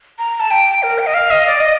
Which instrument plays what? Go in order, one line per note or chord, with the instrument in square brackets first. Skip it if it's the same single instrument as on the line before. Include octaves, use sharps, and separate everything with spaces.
[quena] A#5
A5
G5
A#4
G5
D#5
F5
D#5
D5
D#5